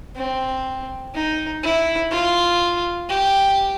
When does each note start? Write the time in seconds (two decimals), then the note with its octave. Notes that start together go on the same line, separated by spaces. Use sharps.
0.16 C4
1.14 D#4
1.63 E4
2.11 F4
3.09 G4